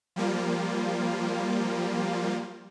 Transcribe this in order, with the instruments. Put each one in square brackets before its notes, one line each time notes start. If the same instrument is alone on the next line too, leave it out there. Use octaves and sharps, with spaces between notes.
[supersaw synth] F3 G3 A#3 F4